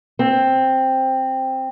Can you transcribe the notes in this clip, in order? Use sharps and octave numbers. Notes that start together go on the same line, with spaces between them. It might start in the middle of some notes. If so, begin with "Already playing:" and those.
C4